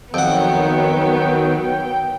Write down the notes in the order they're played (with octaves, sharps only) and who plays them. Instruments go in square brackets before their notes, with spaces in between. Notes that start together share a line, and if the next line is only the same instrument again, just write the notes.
[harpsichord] F2 F#5 [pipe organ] D#3 F#3 [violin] B3 [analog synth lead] G5